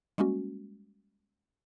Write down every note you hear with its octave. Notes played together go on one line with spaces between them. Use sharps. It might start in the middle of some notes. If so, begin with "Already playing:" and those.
G3 G#3 A#3 C#4 F#4